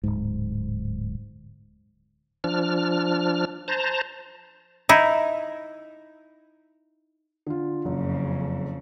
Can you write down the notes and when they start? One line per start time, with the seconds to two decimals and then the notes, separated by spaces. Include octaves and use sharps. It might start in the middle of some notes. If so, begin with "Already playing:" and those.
0.04 D1 G#1 G#2
2.44 F3 D4 F6
3.68 C5 A5 A#5
4.89 D#4 E4
7.47 D3 F4
7.85 F#1 F2 C#3